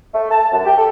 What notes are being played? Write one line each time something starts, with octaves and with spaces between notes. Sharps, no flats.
A3
A5
F#2
G4
A4